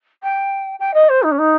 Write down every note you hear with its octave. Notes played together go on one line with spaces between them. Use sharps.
G5
G5
D#5
C5
D#4
C#4
D#4